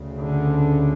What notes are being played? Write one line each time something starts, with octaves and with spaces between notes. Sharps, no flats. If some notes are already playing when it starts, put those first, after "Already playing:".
Already playing: D2 C#3
D3